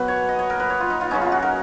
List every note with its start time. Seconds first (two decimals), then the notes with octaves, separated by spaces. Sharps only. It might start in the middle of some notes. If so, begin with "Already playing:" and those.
Already playing: B2 F#3 A#3 F#4 B4
0.08 C#5
0.29 D#5
0.39 C#5
0.50 A#4
0.60 B4
0.70 C#5
0.80 F4
0.90 D#4
1.01 F4
1.11 C#3 F#3 C#4 D#4
1.21 F4
1.32 F#4
1.42 A#4